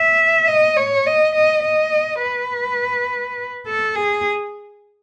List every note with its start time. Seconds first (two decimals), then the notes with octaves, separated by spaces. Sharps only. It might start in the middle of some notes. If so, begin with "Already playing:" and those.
Already playing: E5
0.47 D#5
0.77 C#5
1.06 D#5
1.35 D#5
1.63 D#5
2.22 B4
3.66 A4
3.95 G#4